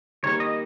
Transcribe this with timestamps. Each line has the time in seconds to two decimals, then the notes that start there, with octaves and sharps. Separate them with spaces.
0.23 D#3 G3 A#3 C#5
0.40 D#5